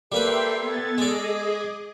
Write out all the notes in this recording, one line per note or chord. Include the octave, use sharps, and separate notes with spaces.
G3 A#3 A4 B4 E5 G5 C6
B3 G#6 A6
G#3 G#4 D5 D#5 D6